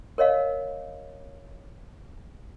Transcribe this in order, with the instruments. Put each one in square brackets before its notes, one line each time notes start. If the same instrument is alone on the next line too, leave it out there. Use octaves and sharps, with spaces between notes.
[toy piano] A#4 C#5 D#5 F5